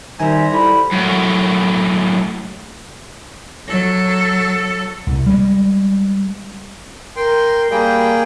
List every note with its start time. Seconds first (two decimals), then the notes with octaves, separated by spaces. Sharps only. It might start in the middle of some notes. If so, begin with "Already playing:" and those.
0.20 D#3 G3 C5 E5 G#5 A#5
0.52 E4 A4 D5 B5
0.92 F#2 A2
3.68 F#3 A4
5.07 C2
5.26 G3 G#3
7.16 A#4 G5 C6
7.71 G3 A#3 G#4 G5